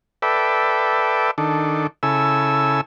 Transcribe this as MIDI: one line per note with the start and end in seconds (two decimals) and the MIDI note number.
0.22 1.31 69
0.22 1.31 71
0.22 1.31 74
0.22 1.31 76
0.22 1.31 79
1.38 1.87 51
1.38 1.87 62
1.38 1.87 69
2.03 2.81 49
2.03 2.81 64
2.03 2.81 69
2.03 2.81 80
2.03 2.81 88